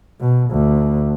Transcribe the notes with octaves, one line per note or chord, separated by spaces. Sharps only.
B2
D2